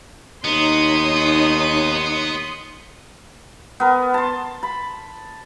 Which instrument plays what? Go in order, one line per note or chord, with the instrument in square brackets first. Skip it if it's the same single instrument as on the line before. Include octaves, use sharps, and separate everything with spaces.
[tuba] D#2 [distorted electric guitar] B3 [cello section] D#4 C#5 [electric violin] C6 D#6
[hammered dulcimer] B3 A#4
A5 C6
B5